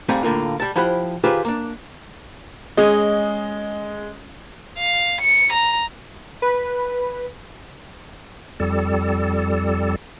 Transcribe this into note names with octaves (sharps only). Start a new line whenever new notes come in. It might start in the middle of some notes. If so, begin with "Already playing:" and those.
G#2 G3 A3 C4 F5 G#5
A2 D3 A#3 F4
G3 A5
F3 E4 G4 C5 F#5 B5
D#3 F4 G4 G#4 B4 C5
A#3 D4
G#3 C#4 G#4 D#5
F5
C#7
A#5
B4
F2 G3 A4